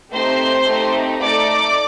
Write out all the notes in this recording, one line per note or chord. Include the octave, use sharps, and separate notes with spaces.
A3 C4 D#4 G4 C5 C6
A3 C4 D#4 G4
A3 D#4 A4 D5 D6